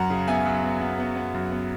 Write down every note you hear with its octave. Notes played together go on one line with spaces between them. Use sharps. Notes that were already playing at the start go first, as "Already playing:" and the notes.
Already playing: F#2 F#5 A#5
C#3
B3 E5 G#5
F#3
B3
B3
B3
B3
F#2
B3